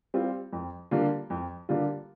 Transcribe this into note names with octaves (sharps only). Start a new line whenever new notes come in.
G3 C4 F4
F2
D3 G3 A#3 F4
F2
D3 G3 A#3 F4